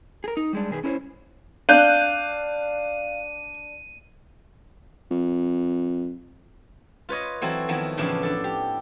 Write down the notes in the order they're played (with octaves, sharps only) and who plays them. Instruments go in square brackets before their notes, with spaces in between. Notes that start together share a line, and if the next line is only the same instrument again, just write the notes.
[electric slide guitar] G#4 A#4
D#4
G3 G#3 D4
B2 D#3 G#4 A#4 B4
C#4 E4 A#4 C5 C#5
[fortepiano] D4 [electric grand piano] F5 [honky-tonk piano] F#6 G6 [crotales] D#7
[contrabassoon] F2
[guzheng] F4 B4 C#5 D#5
E3 F#3 C4 F#4 A4
D#3 F3 F#3 B3 E4
A2 C#3 E3 F3 D4 E4
D4 A4
G4